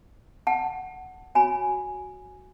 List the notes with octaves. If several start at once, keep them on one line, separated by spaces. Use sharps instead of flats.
F#5 A5
F#4 C#5 G#5 B5